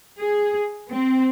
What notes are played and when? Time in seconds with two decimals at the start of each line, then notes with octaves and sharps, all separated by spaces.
0.20 G#4
0.90 C4